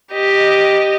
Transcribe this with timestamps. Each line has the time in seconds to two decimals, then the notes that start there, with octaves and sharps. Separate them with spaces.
0.13 G4 D#5